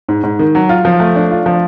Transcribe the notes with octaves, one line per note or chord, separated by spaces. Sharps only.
G#2
G#2
D#3
F#3
F4
F3
A3
D4
F4
F3